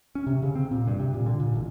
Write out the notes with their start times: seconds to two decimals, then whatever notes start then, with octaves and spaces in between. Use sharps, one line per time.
0.15 C#4
0.27 C3
0.42 C#3
0.55 C4
0.71 A#2
0.88 G2
0.99 C3
1.14 A#2
1.26 D3
1.40 A#2
1.55 A1